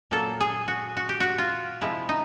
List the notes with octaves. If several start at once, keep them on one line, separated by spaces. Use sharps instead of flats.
A#2 F#3 A#3 A4
G#4
F#4
F#4
G4
F#4
F4
C3 F3 G#3 E4
D#4